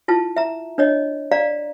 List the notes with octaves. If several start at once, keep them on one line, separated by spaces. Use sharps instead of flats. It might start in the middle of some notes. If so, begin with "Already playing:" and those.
E4 F4 A5
E5 A#5
D4 C#5 D#5
D5 F5 A#5